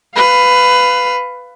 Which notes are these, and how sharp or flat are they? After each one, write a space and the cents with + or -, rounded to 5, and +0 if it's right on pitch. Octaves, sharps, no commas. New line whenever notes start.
B4 +15 F5 +0